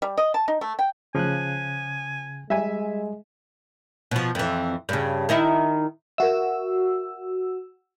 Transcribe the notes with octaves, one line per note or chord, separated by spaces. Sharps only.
G3
D#5
A5
D#4
A3
G5
C#3 F3 G#5 F#6
G3 G#3 E5 G#5
B2 F3
F2 E3
G2 C#3
D#3 D#4 E4
F#4 A#4 E5 E6